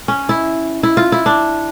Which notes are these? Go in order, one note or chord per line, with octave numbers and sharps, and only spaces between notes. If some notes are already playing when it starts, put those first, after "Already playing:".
C#4
E4
E4
F4
E4
D4